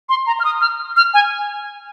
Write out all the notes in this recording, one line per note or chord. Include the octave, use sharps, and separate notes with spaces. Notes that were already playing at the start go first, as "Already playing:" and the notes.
C6
A#5
F6
D#6
F6
F6
G#5